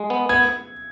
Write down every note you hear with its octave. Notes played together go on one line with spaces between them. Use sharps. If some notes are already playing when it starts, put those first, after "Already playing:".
Already playing: G#3
B3
B3 G#6